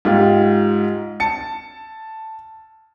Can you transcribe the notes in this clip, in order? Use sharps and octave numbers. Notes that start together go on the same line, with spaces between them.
G#2 F4 G4
A5 C#7